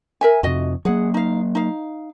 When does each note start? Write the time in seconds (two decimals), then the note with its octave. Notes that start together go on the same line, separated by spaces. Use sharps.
0.21 A#4 E5 G#5
0.43 F2 C3 F#4 D#5
0.85 F#3 A#3 G#4 F#5
1.14 D#4 F5
1.55 D#4 F5